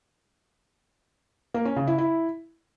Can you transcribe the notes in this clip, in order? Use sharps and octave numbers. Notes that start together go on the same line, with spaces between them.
A#3
C#4
C#3
E4
E4